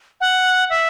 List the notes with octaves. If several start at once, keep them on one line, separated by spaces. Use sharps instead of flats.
F#5
E5